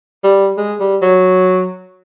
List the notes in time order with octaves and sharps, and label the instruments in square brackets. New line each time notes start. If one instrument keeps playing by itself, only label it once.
[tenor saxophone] G3
G#3
G3
F#3